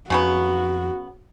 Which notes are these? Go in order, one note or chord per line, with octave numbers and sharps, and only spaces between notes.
F2 C#3 F#3 B3 F#4